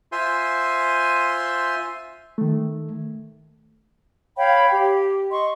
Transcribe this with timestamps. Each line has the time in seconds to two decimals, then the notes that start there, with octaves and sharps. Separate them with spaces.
0.12 F4 C5 E5 G#5 C6
2.38 D#3 A3
4.36 C#5 F5 G5 B5
4.72 G4
5.31 D#5 C6 C#6